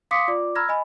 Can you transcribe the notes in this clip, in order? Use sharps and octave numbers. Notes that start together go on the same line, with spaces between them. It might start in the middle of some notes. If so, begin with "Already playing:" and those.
F5 C6 D6 D#6 B6 C#7
F4 D5 D6
A#5 B5 E6 F6 G#6 A#6
D#5 G#5 B5